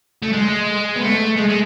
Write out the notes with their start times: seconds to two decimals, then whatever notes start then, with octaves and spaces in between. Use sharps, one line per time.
0.23 A3
0.33 G#3
0.96 B3
1.01 A3
1.36 G#3
1.48 G#3